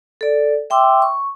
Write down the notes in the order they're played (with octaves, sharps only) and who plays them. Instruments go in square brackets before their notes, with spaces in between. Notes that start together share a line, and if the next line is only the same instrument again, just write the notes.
[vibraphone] A4 D5
E5 G5 C6 D6 E6
C#6